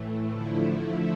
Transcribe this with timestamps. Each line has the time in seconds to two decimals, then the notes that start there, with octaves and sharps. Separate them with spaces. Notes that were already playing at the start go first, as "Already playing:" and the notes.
Already playing: A2 E3 A3
0.30 D3 F3 A3 E4